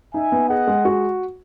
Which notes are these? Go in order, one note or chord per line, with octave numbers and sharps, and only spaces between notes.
D#4 E5 G#5
B3
G#4 D#5 F#5
G#3
F#4